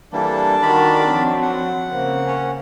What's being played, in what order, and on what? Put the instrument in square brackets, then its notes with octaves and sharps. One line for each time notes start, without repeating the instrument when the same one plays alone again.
[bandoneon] E3 G3 A#3 [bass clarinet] D4 [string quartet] A4
[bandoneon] D#3 D5 B5 [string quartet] F#4 A#4
[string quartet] F3 F#3 C4
[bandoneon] F#5
[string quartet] C#3 A#3 C4
[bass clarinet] C#4